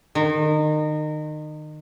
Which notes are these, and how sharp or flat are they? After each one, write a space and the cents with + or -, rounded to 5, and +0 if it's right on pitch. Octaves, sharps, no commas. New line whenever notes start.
D#3 -30